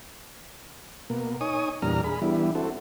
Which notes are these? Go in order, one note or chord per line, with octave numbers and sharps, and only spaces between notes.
B2 A#3
D#4 C#5 G#5 D#6
E2 A#2 G3 D4 A#5 F6
G#4 B5
E3 G3 B3 D4 E4
C4 E4 F#4 A4